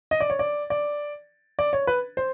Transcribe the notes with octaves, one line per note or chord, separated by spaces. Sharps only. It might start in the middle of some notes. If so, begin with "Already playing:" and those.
D#5
D5
C#5
D5
D5
D5
C#5
B4
C5